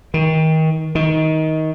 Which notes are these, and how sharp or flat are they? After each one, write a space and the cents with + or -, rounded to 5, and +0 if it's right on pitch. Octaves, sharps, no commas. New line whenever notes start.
D#3 +30
D#3 +20